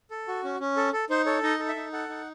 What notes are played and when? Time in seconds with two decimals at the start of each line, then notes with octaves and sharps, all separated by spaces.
0.11 A4
0.28 F#4
0.44 C#4
0.60 C#4
0.77 A4
0.93 A4
1.10 D#4 C5
1.26 A4 C#5
1.43 D#4 D#5
1.59 A4
1.68 E5
1.76 D#4
1.93 A4 F#5
2.09 D#4